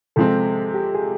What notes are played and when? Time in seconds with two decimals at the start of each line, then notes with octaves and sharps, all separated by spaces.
0.16 C3 F3 G#3 C4 A4
0.74 G4
0.95 G#4